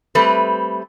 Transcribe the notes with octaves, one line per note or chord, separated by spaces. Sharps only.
G3 A3 C4 B4